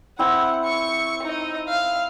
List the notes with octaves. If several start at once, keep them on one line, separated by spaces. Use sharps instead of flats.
C4 E4 F#5
C#6 C#7
D#4 D#5
F5